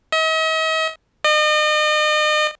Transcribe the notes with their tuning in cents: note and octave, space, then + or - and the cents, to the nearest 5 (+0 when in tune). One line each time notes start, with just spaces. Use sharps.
D#5 +45
D#5 -40